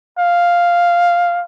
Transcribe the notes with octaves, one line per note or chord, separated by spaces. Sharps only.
F5